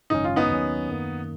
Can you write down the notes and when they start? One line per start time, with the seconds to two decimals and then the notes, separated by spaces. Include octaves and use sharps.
0.10 G#1 F#2 C#3 G#3 C#4 D#4
0.24 F4
0.36 B3 D#4
0.50 D#2 D#3 F#3 C#4
0.90 F#2 D#3 A#3